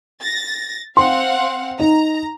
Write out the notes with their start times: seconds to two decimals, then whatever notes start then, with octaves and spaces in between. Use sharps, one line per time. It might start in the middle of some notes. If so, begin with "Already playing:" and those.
0.21 A6 A#6
0.97 C4 F5 F#5 C6
1.79 D#4 A#5